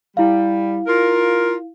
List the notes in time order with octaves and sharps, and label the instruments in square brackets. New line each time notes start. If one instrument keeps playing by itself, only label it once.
[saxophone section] G3 [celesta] E4 F5
[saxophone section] F4 A#4